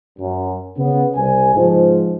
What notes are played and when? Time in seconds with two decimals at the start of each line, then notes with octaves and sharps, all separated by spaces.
0.19 F#2
0.77 C#3 B3
1.16 C2 G#5
1.55 C#2 G#2 F3